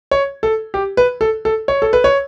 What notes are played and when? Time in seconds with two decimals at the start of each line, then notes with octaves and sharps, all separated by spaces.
0.11 C#5
0.43 A4
0.74 G4
0.97 B4
1.21 A4
1.45 A4
1.68 C#5
1.82 A4
1.93 B4
2.04 C#5